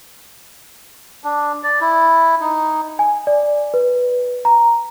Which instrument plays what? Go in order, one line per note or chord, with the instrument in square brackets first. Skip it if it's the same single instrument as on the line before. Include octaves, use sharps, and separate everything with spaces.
[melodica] D4
D5
E4
D#4
[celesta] G#5
D5
B4
A#5